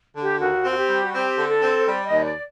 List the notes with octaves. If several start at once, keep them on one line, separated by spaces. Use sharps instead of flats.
D3
G4
D#2 F#4
C4
F#4
G4
G3
F#4
C4 G4
D3
A4
C4
C5
G3 D5
D#5
D#2
D5